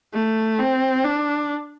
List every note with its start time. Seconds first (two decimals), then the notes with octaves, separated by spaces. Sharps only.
0.13 A3
0.59 C4
1.04 D4